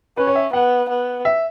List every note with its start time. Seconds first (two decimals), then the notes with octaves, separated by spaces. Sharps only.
0.17 C#4 B4
0.27 C#5
0.35 E5
0.53 B3 F#5
0.90 B3
1.25 E5